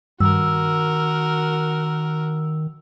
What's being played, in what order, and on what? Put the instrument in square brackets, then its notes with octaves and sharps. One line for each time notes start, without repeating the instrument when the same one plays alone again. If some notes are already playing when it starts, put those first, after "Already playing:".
[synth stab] G2 [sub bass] D#3 [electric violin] F#4 A#4 [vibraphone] E6